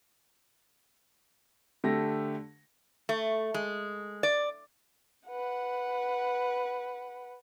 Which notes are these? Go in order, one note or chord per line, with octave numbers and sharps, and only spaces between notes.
D3 A3 G4 A#6
A3
G#3
D5
B4 F#5